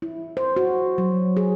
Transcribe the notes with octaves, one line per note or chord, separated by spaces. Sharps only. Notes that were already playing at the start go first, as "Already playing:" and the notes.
E4
C5
F#4
F#3
G#4